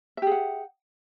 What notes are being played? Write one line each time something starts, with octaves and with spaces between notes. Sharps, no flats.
G4 G#4 E5 F#5